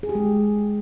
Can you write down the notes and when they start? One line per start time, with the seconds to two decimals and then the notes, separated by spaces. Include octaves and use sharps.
0.03 G#4
0.09 G4
0.15 G#3